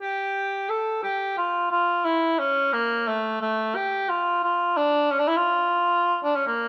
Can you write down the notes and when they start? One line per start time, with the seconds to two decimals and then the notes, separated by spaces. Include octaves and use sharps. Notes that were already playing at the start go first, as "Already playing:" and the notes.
0.01 G4
0.69 A4
1.03 G4
1.38 F4
1.71 F4
2.05 E4
2.39 C#4
2.73 A#3
3.08 A3
3.41 A3
3.75 G4
4.09 F4
4.43 F4
4.77 D4
5.11 C#4
5.19 D4
5.28 E4
5.37 F4
6.24 D4
6.35 C#4
6.47 A#3